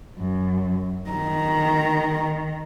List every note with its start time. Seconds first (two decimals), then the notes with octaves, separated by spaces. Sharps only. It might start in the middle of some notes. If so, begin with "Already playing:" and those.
0.18 F#2
1.10 D#3 A#5